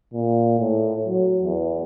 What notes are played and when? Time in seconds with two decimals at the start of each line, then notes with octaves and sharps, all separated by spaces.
0.14 A#2
0.59 A2
1.07 F#3
1.43 E2